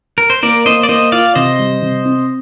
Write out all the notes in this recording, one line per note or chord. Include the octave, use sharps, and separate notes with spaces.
A#4
C5
A#3 A#4 D5
A#3 C5 D#5
D5
A#3 C5 D#5
F4 D5 F5
C3 C5 D#5
G3
C3
C4